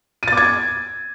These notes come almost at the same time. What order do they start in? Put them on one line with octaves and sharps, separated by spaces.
D#7 A6 D6 G#6